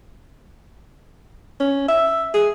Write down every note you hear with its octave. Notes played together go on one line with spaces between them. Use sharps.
C#4
E5
G#4